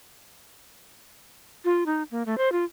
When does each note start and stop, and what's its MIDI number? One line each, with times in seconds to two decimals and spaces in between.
1.65 1.84 65
1.86 2.03 63
2.11 2.23 58
2.26 2.38 57
2.38 2.51 72
2.52 2.64 65